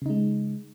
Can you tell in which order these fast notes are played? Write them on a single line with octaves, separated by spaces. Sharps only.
C#3 D#4 G#3